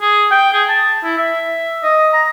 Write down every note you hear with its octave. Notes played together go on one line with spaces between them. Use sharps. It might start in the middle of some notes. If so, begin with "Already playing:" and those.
G#4
G5
G#4
A5
E4
E5
D#5
A#5